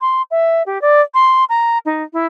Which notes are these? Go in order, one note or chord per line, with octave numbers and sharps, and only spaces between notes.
C6
E5
G4
D5
C6
A#5
D#4
E4